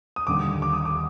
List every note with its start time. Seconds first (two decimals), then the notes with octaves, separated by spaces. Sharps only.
0.16 D#6
0.27 D#2 D3 G3 D6
0.62 D6
0.73 D#6
0.85 D6